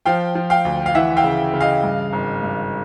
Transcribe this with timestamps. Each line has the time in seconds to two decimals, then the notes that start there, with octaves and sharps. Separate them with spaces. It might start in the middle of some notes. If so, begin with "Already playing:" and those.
0.06 F3 F5 G5
0.35 F3
0.50 F5 G5
0.65 D2
0.86 F5
0.95 E3 E5 F#5
1.17 F5 G5
1.24 C#3
1.54 C#3
1.61 D#5 F5
1.83 G2
2.13 G#1
2.43 G2